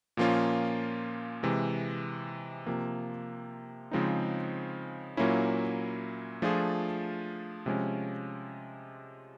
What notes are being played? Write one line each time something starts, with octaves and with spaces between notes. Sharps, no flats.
A#2 F3 A#3 C#4 F4
C3 E3 G#3
C3 F3 A#3
C#3 F3 G#3 C4 D#4
A#2 F#3 A#3 C#4 E4
F3 A3 D4 F4 G#4
C3 F3 G#3 C#4